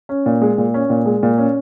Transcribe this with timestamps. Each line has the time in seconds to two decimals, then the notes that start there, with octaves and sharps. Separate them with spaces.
0.09 C#4
0.26 A#2
0.41 G#3
0.58 A#2
0.74 C#4
0.90 A#2
1.06 G#3
1.23 A#2
1.38 C#4